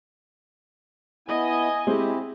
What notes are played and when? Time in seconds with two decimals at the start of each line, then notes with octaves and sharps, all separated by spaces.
1.28 B3 E4 D#5 G#5
1.87 G#3 C4 E4 G4